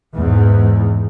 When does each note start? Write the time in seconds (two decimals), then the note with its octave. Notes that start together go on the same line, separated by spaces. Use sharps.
0.14 E2 G#2